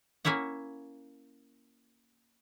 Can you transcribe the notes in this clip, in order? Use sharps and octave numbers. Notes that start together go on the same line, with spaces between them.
A#3 C#4 E4 C#5 F#5